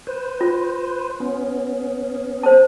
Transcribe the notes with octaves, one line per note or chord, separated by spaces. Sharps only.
B4 C5
F4
B3 C#4
C5 A5